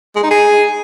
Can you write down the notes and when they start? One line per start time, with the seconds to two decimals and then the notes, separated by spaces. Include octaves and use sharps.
0.16 G#3
0.23 D#4
0.31 G#4